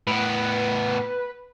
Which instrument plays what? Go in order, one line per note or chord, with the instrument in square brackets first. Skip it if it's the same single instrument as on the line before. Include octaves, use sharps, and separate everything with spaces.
[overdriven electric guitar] A2 B3 [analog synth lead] B4